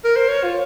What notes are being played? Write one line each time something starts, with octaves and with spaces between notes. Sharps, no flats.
A#4
C5
C#5
F4